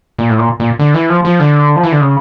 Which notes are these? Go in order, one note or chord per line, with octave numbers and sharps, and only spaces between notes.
A#2
A2
A#2
A#2
D3
E3
F3
F3
D3
F3
E3
D3
C#3